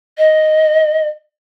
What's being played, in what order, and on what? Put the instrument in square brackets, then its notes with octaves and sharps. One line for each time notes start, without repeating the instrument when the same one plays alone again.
[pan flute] D#5